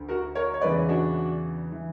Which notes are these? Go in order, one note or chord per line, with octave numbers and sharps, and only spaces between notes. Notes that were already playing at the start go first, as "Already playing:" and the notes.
Already playing: D2 D3
F#4 A#4
A#4 C#5
C#5
E2 C#3 E3 B4 D5
D4 F#4
E3